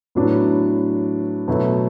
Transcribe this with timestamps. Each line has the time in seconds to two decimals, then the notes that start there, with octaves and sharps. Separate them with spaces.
0.15 A2 F#3 B3 D4
1.48 B2 F#3 A3